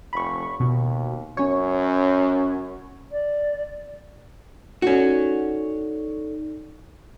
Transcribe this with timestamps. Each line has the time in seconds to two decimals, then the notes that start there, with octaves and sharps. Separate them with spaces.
0.13 F1 B5 C#6
0.60 D#2 B2
1.37 F#2 C#4 C#5
3.12 D5
4.82 C#4 D#4 F#4 A4 D5